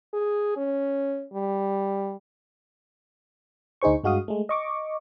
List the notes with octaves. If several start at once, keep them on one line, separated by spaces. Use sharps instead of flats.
G#4
C#4
G3
D2 D#4 G#4 C5 C#6
G2 G#3 F#4 F5 D#6
G#3 A3
D#5 C#6 D6